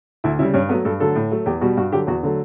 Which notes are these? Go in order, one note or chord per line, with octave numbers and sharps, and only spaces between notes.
D2 E4
C#3 G3 E4
G2 C#4
F#3 A3 B3
G2 A4
D3 F#3 A3 A4
A2
F#3 A3
E2 G4
B2 G3 F#4
G2 F#4
D3 F#3 G4
E2 F#4
D3 F#3 A3